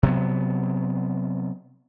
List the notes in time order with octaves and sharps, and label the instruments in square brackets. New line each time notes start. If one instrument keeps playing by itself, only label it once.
[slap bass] C3 F#3 B3